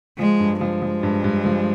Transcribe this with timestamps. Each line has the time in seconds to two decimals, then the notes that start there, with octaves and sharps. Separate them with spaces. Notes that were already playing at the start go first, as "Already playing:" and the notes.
0.19 F3 G#3
0.40 G2
0.61 F3 G#3
0.82 F3
1.03 G2
1.24 G2
1.45 F3